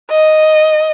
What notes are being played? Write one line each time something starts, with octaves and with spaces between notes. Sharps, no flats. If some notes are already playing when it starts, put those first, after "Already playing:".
D#5